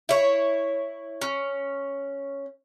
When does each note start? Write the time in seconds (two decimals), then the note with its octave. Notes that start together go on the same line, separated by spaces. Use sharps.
0.09 E4 C#5
1.22 C#4